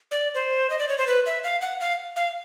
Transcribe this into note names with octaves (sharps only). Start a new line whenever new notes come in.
D5
C5
D#5
D5
C#5
C5
B4
E5
F5
F#5
F5
F5